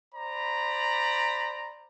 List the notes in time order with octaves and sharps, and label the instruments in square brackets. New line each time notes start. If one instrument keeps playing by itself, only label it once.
[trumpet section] C5 D5 A#5 B5